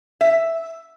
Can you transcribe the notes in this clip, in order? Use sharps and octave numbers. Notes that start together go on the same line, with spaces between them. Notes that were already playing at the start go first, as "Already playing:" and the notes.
E5